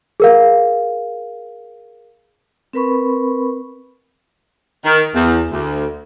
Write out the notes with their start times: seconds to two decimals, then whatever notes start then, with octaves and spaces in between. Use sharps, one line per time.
0.20 G#4 A#4 F5
2.73 C4 A#4 B4 B5 C#6
4.85 D#3
5.15 E2
5.51 D2